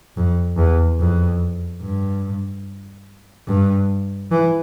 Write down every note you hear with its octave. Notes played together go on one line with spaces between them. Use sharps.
F2
E2
F2
G2
G2
E3